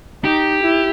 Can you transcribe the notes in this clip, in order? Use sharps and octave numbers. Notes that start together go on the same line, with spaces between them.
D#4 G4
E4